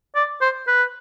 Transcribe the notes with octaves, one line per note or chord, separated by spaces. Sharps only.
D5
C5
B4